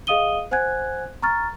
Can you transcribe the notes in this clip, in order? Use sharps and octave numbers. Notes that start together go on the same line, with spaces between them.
G#4 D#5 F5 D#6 D#7 G7
C5 F#5 G#5 F#6 G#6
A#5 C#6 F6 A6